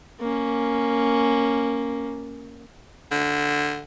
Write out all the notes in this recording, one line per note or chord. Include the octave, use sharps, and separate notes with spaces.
A#3 C#4
D3